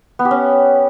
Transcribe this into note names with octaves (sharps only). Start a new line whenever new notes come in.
B3
G4
C#4